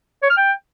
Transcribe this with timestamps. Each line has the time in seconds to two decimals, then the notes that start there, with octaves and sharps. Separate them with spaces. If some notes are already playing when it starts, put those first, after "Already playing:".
0.23 C#5
0.30 F6
0.37 G5